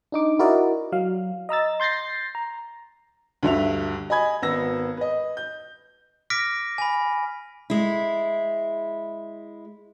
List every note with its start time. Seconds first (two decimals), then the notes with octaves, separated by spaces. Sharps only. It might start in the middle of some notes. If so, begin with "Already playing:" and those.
0.12 D4 D#4 D6
0.39 E4 F#4 A#4 D5 D#5
0.92 F#3 F5
1.49 D#5 A#5 E6 A6
1.80 C6 G6 A6 A#6 C7
2.35 A#5
3.43 D2 G2 E5 F7
4.10 D#5 G#5 B5 G#6
4.42 G#1 B3 E6 A#6
4.97 B4 D#5
5.37 G6
6.30 D6 F6 A#6 B6 D7
6.78 G#5 B5
7.70 G#3 E4